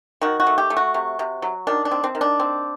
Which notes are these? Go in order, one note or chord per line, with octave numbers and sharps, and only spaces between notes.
D#3 F#4
F#4
A3
G4
A3
F#4
C3
C3
F#3
D#3 D4
D4
C4
C4
D#3
D4
C4